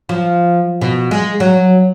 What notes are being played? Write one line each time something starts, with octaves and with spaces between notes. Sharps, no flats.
F3
B2
G#3
F#3